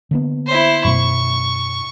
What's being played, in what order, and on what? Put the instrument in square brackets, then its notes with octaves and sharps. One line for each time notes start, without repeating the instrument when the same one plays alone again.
[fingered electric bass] D3 A#3 B3
[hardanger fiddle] E4 C5
[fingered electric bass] F#2 B2 [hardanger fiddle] C#6